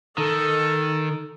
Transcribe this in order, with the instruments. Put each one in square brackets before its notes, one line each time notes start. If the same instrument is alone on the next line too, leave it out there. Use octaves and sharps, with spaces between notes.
[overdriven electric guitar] D#3 [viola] A4